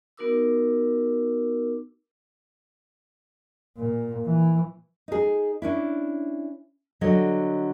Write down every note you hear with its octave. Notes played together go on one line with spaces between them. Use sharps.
B3 D#4 F#4 A#4 D6 E6
A#2
E3
D#4 G#4
C#4 D4 E4
D3 F#3 C#5 D#5